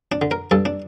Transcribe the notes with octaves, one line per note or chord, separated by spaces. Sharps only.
D4
D3
A#4
G2 A4
D4